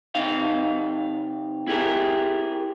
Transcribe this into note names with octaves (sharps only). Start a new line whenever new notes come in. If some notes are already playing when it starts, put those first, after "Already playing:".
C3 D#4 F5
E4 G4 G#4 A#4